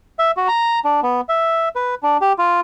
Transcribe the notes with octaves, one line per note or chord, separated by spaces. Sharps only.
E5
F#4
A#5
D4
B3
E5
B4
D4
G4
F4